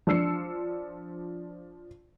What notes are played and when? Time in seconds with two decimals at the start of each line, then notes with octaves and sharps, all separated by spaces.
0.07 F3 D4 E6 C7 C#7